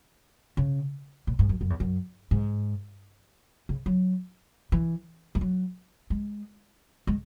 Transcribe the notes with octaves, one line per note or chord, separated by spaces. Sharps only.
C#3
A#2
G#2
F#2
F#2
E2
F#2
G#2
C#3
F#3
E3
G#3
F#3
G#3
G#3